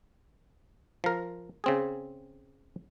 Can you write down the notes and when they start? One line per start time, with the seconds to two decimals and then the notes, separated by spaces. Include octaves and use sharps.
1.04 F3 A#4
1.64 C#3 C4 G#4